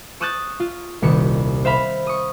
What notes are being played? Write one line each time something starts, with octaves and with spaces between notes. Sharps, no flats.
C#6 D#6 E6 F#6 G6 A6
F4
D#1 C2 C#7
C5 E5 F5 B5
C#6 D#6